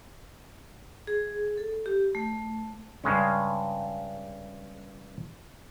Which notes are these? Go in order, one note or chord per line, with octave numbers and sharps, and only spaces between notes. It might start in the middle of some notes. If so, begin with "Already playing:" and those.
G#4
A4
G4
A3
G2 C#3 G#3 C#4